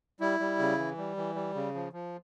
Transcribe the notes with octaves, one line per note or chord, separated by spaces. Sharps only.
G3 E4
G3
C#3
E3
G3
E3
G3
C#3
F3
F3